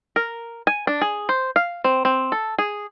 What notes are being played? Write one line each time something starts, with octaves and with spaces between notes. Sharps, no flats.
A#4
G#5
D4
G#4
C5
F5
C4
C4
A4
G#4